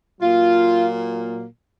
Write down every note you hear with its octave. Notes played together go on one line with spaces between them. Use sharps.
A#2 F#3 A#3 F4